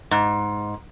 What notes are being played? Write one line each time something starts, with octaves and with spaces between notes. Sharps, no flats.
G#2